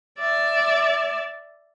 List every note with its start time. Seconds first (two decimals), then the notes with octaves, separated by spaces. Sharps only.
0.19 D5 E5